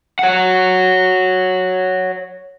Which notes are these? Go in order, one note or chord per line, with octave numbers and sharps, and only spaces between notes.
C#5 F#5